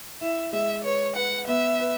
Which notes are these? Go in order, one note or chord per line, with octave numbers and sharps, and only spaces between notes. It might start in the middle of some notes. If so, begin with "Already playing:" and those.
E4 E5
G#3 E5
B4 C#5
B4 F#5
B3 E5
B4